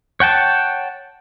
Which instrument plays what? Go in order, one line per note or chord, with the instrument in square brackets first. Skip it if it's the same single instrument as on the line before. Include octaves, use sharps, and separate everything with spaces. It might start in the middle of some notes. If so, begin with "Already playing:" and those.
[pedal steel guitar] C#5 F#5 G5 A5